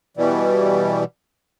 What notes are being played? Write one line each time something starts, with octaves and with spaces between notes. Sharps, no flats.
B2 E3 G3